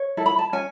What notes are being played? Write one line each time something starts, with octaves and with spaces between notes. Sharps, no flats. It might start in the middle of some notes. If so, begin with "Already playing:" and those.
Already playing: C#5
E4 A4
B5
A5
C#4 G#5